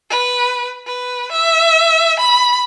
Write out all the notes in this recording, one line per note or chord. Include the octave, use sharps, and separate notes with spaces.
B4
B4
E5
B5